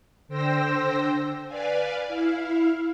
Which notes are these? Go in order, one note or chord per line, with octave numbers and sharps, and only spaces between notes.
D3 C5 G5 E6 A#6
B4 D5 F5 G#5
E4 F5